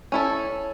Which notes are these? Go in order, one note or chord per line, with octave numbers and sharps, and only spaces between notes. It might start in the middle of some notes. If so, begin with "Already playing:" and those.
C#4 E4 A4